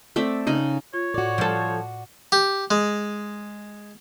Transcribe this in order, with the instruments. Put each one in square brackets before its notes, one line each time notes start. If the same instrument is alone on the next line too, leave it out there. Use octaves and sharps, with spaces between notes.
[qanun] A3 C4 D5 E5
C#3 D#4 G#4
[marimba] F4 [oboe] C#5
[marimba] A2 [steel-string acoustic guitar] F#4 D5
[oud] F3 A4 [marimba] C5
[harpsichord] G4
G#3